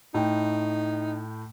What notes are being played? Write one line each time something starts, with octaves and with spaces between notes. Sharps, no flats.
A2 D#4 G5